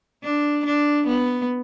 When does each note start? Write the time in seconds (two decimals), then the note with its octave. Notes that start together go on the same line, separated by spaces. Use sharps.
0.24 D4
0.66 D4
1.07 B3